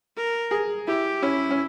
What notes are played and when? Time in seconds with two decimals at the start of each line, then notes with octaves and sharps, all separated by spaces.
0.16 A#4
0.51 G#4
0.87 E4 G4
1.22 C#4 E4
1.51 C#4